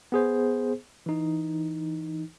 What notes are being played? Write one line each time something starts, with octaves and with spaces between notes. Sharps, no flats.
B3 G#4 C5
E3 D#4